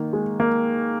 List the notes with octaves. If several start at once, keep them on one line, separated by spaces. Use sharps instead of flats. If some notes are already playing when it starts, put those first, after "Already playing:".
Already playing: D#3 A#3 D#4
G#3
A#3